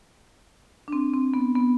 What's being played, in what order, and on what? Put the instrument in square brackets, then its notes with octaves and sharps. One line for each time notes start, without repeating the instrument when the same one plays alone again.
[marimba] D4
C4
C4
B3
B3